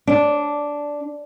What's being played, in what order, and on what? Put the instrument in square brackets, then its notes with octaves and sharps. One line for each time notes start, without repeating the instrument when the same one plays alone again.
[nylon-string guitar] D4